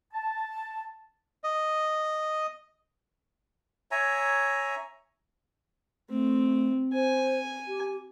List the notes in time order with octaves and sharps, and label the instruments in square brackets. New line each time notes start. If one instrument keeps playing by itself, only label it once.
[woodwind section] A5
[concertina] D#5
[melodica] C#5 E5 G#5 A#5
[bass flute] A3 [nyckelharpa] C4
[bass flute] C5 [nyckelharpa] G#5
[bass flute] G4